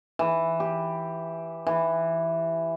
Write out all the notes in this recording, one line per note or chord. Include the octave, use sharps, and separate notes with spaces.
E3
G4
E3